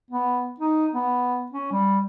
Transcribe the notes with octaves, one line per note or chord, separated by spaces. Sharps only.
B3
D#4
B3
C#4
G3